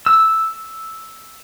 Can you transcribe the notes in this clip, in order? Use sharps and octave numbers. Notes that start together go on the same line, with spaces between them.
E6